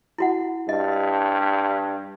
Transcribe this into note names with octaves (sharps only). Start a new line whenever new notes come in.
E4 F#4 F#5
G2 D#5